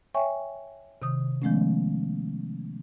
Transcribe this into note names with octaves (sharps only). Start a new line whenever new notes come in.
C#5 E5 G5 G#5 C#6
C3 D#3 D#6
D#3 F3 G#3 A3 B3 C#4